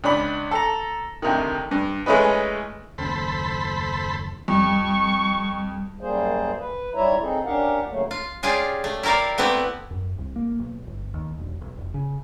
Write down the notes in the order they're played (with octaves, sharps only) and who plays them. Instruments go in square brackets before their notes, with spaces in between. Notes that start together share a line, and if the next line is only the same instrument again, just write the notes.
[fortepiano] C#2 D4 B5
A4 A#5
D2 C3 D#3
G2
E3 G#3 A3 C#4 D#4 B4
[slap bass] F#1 D#2 C#4 [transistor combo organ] A4 C5 B5
[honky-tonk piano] F2 [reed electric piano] G3 [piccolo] C#6
[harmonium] F#2 G3 A#3 G#4 C5
B4
G#2 G3 E4 C#5 E5 A#5
C4 D#4 G#4 A4
C#4 D4 G4 A#4 F5 F#5
C#3 F#3 A3 A#3
[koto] F4
C#4 F4 G4 G#4 D5
A3
E4 G4 A#4 D5 F5
A3 B3 C4 E4 G4
[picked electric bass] F#2
C2
A#3
B1
G1
D#2
E1
B1
F1
C#3